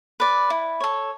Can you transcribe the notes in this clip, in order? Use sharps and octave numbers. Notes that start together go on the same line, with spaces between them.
B4 D5
E4
A4 C#5